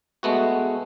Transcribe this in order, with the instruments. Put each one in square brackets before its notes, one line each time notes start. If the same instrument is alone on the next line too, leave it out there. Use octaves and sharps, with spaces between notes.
[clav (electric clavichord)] G#3 A3 B3 F#4